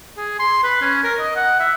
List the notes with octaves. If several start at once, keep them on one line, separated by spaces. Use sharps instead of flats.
G#4
C6
B4
C#4
A#4
D#5
F#5
E5